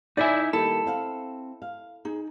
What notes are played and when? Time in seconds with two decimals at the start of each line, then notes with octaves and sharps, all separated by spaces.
0.17 D3 D#4 E4 D5 E5 G#5
0.53 D#3 G3 A#3 E4 A4
0.86 C4 F5 F#5
1.62 F5
2.05 D#4 G#4